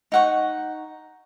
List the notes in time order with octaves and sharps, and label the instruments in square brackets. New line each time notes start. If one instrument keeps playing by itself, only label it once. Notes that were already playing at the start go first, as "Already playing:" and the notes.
[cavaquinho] D#4 F#5 C#6